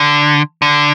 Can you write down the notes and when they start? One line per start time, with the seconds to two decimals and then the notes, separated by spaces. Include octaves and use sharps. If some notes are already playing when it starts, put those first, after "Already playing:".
Already playing: D3
0.62 D3